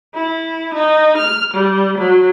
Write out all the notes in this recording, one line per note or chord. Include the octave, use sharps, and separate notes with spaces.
E4
D#4
F6
G3
F#3